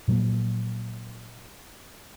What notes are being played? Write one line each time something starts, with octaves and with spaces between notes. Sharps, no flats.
A#2 F3 F#3 A#3